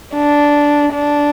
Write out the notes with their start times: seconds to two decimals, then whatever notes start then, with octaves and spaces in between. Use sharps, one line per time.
0.16 D4
0.93 D4